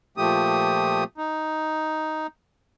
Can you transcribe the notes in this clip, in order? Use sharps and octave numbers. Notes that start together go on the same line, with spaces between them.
A#2 F3 A3 G4 D#6
D#4